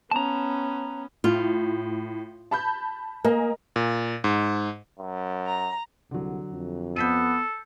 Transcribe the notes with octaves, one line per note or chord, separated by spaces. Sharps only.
B3 C#4 A5 A#5
A2 F4
A5 B5 G6
A#3 A#4 D#5 G#5
A#2
G#2
F#2
A#5
C2 D3 F#3
F2
B3 A4 G6 B6 D#7